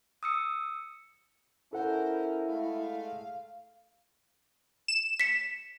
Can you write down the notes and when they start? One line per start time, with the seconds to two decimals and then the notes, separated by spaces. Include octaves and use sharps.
0.23 D#6 E6 C#7
1.73 C#4 E4 A4 A#4 C5 F#5
2.47 G#3 A3 F5
4.88 E7
5.20 B6 C#7